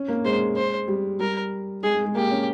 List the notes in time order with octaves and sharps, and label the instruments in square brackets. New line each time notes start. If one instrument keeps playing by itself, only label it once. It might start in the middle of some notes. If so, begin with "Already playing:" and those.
Already playing: [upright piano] C#4
A#3
[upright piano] G#3 [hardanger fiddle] C5
[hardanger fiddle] C5
[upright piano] G3
[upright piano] G3 [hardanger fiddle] A#4
[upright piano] G#3 [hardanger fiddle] G#4
[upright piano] G#3
G#3
[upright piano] A#3 [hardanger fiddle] G4
[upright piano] C#4